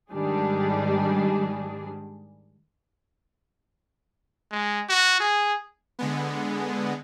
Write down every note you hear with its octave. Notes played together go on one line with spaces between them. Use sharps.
G#2 D#3 G3 D4 G#4
G#3
F#4
G#4
D3 G#3 B3